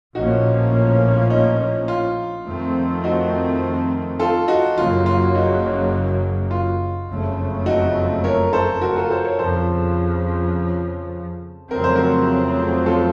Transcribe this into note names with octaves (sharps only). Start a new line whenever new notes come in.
A#1 A2 F3 A#3 C#4 D#4 F#4
D#4
F4
F2 D#3 A3 C4
D#4 F#4
F4 A4
D#4 F#4
F#1 F#2 C#3 F#3 A#3 F4
F4
D#4 F#4
F4
F#1 F2 C#3 A3
D#4 F#4
A#4 C#5
A4 C5
F#4 A#4
F4 A4
A4 C5
A#4 C#5
F2 C#3 F3 A4 C5
F2 C#3 F#3 A3 C4 A#4
C5
F#4 A#4
F4 A4